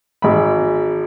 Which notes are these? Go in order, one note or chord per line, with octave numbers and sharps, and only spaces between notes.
G#1 B5